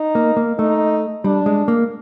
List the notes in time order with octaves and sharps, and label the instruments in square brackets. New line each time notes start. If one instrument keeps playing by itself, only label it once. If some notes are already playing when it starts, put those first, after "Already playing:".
Already playing: [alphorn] D#4
[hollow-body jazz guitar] A#3
A#3
[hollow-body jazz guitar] A3 [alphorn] D#4
[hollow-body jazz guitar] G3 [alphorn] D4
[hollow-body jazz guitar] G#3
A#3